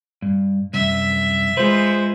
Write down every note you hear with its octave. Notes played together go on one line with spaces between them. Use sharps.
G2
C2 F#2 E5
G#3 F4 B4 C5